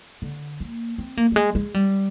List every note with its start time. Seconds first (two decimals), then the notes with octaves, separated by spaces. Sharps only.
0.22 D3
0.60 A#3
0.98 C4
1.17 A#3
1.32 G3
1.36 G#3
1.55 G#3
1.74 G3